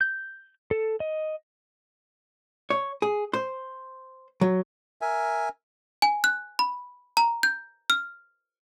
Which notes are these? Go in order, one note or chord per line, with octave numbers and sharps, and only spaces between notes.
G6
A4
D#5
C#5
G#4
C5
F#3
A#4 E5 G#5
G#5
F#6
B5
A#5
G6
F6